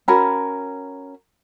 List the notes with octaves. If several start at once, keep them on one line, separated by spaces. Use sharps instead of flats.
C#4 F#4 A#4 B5